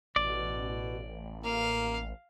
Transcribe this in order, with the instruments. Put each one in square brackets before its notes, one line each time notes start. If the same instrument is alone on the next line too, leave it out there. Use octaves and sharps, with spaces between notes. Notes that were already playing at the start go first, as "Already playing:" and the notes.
[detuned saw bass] A1 [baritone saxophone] B2 [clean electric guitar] D5
[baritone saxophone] A#3 [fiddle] F5